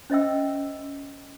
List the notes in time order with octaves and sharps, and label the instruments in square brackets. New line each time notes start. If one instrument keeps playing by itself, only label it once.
[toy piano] C#4 C5 D#5 E5 G5 E6